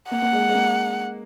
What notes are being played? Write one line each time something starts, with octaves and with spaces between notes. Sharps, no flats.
A#3 F#5
A#3
G#3
G#3
A#3